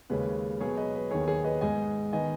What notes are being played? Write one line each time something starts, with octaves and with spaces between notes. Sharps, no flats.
D#2 C#3 G#3 C#4 B4
B2 F#3 B3 G#4 C#5
B4 D#5
B4
D#2 D#3 B3 G#4 C#5
G#4 C#5
B4 D#5
G#2 G#3 B3 D#5 G#5
D#3 B3 D#5 G#5